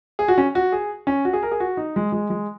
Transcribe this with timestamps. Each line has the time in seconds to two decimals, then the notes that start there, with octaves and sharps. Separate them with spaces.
0.19 G#4
0.28 F#4
0.38 C#4
0.55 F#4
0.72 G#4
1.07 C#4
1.25 F#4
1.33 G#4
1.43 A#4
1.51 G#4
1.60 F#4
1.77 D#4
1.96 G#3
2.12 G#3
2.30 G#3